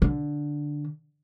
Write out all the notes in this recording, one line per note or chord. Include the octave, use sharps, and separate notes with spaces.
D3